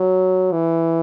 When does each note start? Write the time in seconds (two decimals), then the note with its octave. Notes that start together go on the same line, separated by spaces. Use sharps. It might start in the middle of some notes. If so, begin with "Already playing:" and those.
Already playing: F#3
0.52 E3